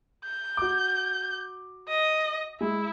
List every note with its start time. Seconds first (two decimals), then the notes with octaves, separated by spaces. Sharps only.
0.25 G6
0.57 F#4 D6
1.88 D#5
2.61 G#3 E4